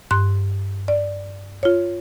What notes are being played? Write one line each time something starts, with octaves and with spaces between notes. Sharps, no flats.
G2 C6 F#6
D5
F4 C#5